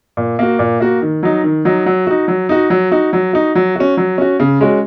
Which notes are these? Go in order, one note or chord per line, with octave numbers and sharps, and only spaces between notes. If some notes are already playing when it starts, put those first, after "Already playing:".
A#2
A#3 F#4
A#2
A#3 F#4
D#3
F#3 D#4
D#3
F#3 D#4
F#3
D#4 F#4
F#3
D#4 F#4
F#3
D#4 F#4
F#3
D#4 F#4
F#3
C#4 F#4
F#3
C#4 F#4
C#3
G#3 C#4 F#4